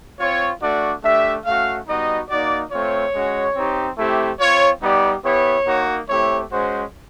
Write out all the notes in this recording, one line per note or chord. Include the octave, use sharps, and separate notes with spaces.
C4 F4 C#5
A3 D4 F#4 D5
A3 D4 G4 E5
A3 C#4 F#4 F5
G3 B3 D#4 F#4 D#5
A#3 D#4 F#4 D5
A3 C4 F4 C#5
G#3 C#4 F#4
C4 D#4 G4
A3 C4 E4 G4
C4 F4 C#5
G3 B3 D#4 G4 D5
B3 E4 G4 C#5
A#3 D#4 F#4
A3 C4 E4 G4 C#5
G#3 C#4 F#4 C5